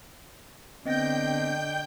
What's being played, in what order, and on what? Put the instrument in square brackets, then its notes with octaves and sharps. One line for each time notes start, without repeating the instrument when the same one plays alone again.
[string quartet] D3 [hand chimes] B3 C4 A#6 [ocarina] D#5 [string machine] G5 G6